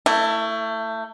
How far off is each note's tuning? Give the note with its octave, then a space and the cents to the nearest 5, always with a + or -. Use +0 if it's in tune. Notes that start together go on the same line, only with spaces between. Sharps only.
A3 +25 E4 +0